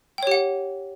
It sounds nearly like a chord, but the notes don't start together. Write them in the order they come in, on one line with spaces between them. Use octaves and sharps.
G5 C#5 G4 F#5